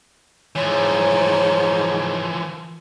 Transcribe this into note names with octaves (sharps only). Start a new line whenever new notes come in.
G#2 E3 F3 C#5